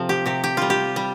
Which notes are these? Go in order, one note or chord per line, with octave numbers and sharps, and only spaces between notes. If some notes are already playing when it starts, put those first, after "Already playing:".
Already playing: C3 F3
G4
C3 G4
G4
G3 F4
G4
G3